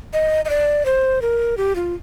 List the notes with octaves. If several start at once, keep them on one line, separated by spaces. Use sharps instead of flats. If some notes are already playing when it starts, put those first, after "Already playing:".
D#5
D#5
D5
C5
A#4
G4
F4